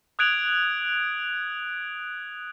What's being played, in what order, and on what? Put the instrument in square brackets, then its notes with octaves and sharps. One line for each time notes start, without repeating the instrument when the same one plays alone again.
[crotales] D#6 F#6 G#6 D7 F7 F#7